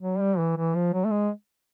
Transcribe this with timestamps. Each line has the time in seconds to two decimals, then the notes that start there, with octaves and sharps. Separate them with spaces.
0.01 F#3
0.19 G3
0.38 E3
0.57 E3
0.75 F3
0.93 F#3
1.05 A3
1.10 G#3